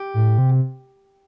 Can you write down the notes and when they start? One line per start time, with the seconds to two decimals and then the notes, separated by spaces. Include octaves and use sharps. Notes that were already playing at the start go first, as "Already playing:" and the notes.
Already playing: G4
0.14 A2
0.38 C3